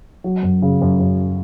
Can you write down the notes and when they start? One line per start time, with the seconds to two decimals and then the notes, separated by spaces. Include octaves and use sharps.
0.24 F#3
0.43 F#2
0.62 C#3
0.81 F#2
1.00 F#2